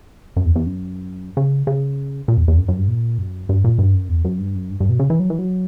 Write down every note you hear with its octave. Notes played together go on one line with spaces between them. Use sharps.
F#2
E2
E2
F#2
C#3
C#3
A#2
E2
E2
F#2
F#2
G2
A#2
F#2
G2
A#2
G2
F#2
E2
F#2
G2
F#2
G2
G2
B2
C#3
E3
F#3
E3
F#3